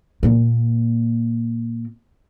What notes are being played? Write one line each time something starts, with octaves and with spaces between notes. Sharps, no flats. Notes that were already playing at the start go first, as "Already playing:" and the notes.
A#2 A#3